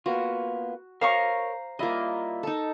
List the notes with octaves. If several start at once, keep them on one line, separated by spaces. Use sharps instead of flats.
A#3 B3 F4 F#4
A#4 C5 C#5 F5 A#5 C#6
G3 A#3 E4 F4 D#5
D#4 A4